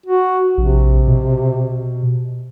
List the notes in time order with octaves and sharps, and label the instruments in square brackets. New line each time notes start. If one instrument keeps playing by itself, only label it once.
[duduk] F#4
[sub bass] A#1 [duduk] C3
[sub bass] B2